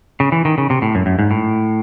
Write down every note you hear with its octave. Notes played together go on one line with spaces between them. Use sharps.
C#3
E3
D#3
C#3
C3
A2
F#2
F#2
G#2
A2